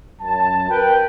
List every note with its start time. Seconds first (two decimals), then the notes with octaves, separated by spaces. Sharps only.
0.20 F#2 A5
0.69 A#4 B4 G5